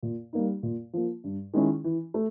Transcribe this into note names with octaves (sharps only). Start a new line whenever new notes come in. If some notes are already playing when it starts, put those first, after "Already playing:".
A#2
G3 A#3 D#4
A#2
F3 A#3
G2
D#3 G#3 C#4 E4
E3
A3